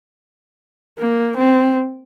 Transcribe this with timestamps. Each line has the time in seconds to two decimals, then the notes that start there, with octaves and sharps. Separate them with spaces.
0.99 A#3
1.38 C4